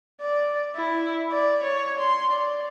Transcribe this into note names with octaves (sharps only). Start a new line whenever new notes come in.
D5
E4
D5
C#5
C6
D5